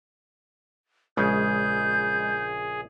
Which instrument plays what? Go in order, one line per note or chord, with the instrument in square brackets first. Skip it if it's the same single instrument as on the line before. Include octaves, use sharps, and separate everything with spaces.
[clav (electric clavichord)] A#1 C#3 [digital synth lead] G#3 [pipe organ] G#4 [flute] G6